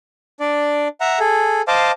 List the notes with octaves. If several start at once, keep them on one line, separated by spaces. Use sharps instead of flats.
D4 D5
E5 F#5 A#5
G#4 A4
C5 D#5 F5 A5 D6